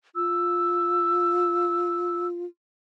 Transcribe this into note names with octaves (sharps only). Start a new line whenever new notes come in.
F4 E6